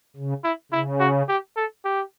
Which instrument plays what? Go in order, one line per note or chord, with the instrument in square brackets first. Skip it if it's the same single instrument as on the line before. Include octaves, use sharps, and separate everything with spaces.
[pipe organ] C#3
[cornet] E4
[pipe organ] C#3 [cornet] E4
[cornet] F#4
G4
A4
G4